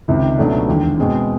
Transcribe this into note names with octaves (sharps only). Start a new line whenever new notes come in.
C#2 C3 D#3
C#2 B2 F#3 A3 D4
E1 D#2 D3
B2 G#3 C4